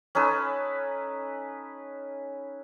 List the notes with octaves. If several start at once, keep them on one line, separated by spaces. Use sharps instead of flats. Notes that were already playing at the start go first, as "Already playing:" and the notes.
C#4 D#4 A4 B4